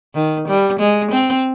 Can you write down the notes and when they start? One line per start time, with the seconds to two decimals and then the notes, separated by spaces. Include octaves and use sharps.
0.15 D#3
0.48 G3
0.80 G#3
1.12 C4